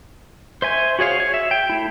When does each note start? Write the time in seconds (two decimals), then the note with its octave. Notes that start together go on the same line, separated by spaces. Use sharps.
0.62 C5 E5 G#5 C#6
0.99 F#4 G#4 C#5 F5
1.20 C#5
1.34 E5
1.51 G5
1.70 A3 E4